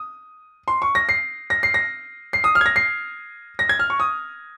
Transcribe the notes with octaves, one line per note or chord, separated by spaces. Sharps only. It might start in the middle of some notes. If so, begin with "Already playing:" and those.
Already playing: D#6
C6
C#6
A#6
C7
A#6
C7
A#6
C7
D#6
F6
G#6
A#6
C7
A#6
G#6
F6
C#6
D#6